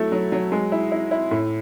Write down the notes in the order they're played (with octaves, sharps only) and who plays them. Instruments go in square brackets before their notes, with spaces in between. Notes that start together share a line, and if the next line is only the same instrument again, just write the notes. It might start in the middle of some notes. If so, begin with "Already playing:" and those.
Already playing: [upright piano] F#3 A3 E4
F#3
F#3
G#3
E4
E4
E4
A2